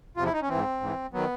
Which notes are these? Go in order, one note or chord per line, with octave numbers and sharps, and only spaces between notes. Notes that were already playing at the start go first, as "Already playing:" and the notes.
E2 C3 F3 F4
E4
D#4
C#4
E3 C4
G#2
G#2 E3
D#3 F#3 B3